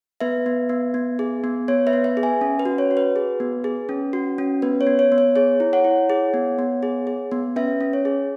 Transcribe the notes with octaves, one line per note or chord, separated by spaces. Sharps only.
B3 B4 E5
B3
B3
B3
G#4
B3
B3 C#5
B4 E5
B3
B4 E5
G#4
E5 G#5
C#4
B4
F#4
C#5
F#4
B4
G#4
B3
G#4
C#4
F#4
C#4
B3 B4
C#5
B3
C#5
B3
C#5
G#4 C#5
E4
C#5 F#5
E4
G#4
B3
B3
G#4
G#4
B3
C#4 B4 E5
C#4
C#5
G#4